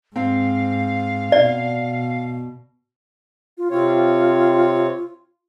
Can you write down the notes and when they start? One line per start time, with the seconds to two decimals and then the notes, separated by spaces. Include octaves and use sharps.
0.16 G#2 C4 F5
1.32 B2 D5
3.58 F4
3.71 C3 C4 F4 C#5